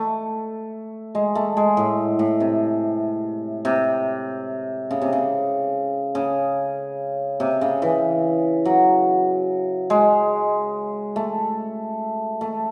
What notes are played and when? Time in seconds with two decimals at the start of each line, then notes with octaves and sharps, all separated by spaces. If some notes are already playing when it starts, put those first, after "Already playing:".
Already playing: A3
1.15 G#3
1.35 A3
1.57 G#3
1.77 A2
2.19 A2
2.40 C3
3.65 C3
4.91 C#3
5.02 C3
5.13 C#3
6.15 C#3
7.40 C3
7.61 C#3
7.82 E3
8.65 F#3
9.90 G#3
11.16 A3
12.41 A3